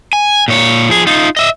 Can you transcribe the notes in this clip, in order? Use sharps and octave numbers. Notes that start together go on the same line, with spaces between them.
G#5
A#2 C#5
F3 G#4
D#4 F4
D#5 E5